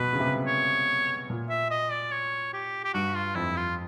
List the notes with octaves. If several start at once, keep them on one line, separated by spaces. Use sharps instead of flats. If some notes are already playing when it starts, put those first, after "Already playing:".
Already playing: B2 B4
C#3
C3
C#5
A#2
E5
D#5
D5
C#5
G4
G4
G2 F#4
F4
F2 E4
F4